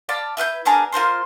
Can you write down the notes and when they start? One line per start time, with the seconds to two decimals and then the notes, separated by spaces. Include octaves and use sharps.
0.09 D5 F5 A5 B5
0.37 E4 B4 F#6 G6
0.65 B3 D4 G#4 A#4
0.92 F4 A#4 C5 C6